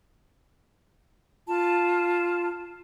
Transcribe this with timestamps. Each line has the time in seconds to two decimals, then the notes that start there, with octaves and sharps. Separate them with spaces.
1.47 F4 A5